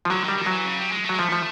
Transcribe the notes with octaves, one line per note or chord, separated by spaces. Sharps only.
F3
D3 F#3
D#3 G3
D#3
E3 F#3
C#3
G3
G#3
A3
F#3 G#3
F3 A3
F3